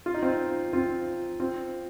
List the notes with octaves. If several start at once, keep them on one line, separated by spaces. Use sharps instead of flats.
F4
D#4
C4 F4
C4 F4
C4 F4